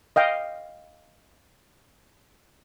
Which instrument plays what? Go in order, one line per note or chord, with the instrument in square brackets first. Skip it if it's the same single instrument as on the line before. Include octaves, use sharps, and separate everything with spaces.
[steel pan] D#5 F5 G5